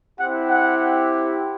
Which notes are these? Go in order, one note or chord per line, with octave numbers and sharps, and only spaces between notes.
C4 E4 G4 F#5
F#5